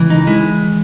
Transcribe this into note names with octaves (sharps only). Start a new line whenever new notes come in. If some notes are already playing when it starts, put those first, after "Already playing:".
Already playing: C#2 E3
D#4
G#3 E4